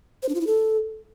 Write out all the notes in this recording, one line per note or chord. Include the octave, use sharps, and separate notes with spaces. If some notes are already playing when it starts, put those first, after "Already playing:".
C5
D4
F4
E4
A4